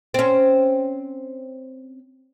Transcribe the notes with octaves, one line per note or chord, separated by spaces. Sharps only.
C4 C#4